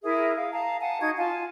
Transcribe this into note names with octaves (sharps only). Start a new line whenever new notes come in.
E4 G#4 A#4 E5
F5
F5 A5 A#5
F5 F#5 G#5 A5
D#4 F#4 G#6
F4 F5 G#5 A5